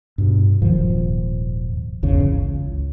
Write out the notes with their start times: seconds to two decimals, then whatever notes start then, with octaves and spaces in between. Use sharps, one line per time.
0.18 G2 B2
0.62 D#1 G#2 D#3 F3
2.03 G1 E2 C#3
2.24 C#2